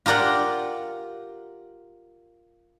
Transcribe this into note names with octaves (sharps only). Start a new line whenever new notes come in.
F4 G4 A#4 D5 F#5